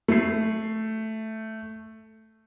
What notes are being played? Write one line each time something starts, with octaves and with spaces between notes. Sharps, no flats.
A3 C7